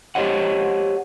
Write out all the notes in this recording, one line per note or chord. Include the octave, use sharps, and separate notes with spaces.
G4 C5 C#5 D#5 F#5